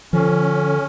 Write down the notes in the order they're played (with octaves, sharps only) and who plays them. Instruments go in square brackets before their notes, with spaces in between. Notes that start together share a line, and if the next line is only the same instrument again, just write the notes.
[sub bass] D3 [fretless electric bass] F3 [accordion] C#4 [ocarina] A4